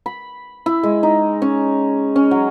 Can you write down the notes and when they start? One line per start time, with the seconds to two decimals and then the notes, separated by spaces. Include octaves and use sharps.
0.06 B5
0.66 E4
0.83 G#3
1.03 D#4
1.42 C#4
2.16 C#4
2.31 F#3